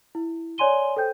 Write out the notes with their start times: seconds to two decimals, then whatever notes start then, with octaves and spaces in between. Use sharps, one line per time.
0.15 E4
0.58 C#5 D5 G#5 C6 D#7 G7
0.97 A4 C5 G5 G6